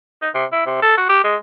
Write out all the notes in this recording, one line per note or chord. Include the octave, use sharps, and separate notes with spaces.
D#4
C3
E4
C3
A4
F#4
G4
G#3